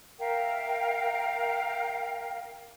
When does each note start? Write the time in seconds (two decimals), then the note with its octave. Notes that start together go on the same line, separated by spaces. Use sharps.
0.19 A#4 E5 F5 G5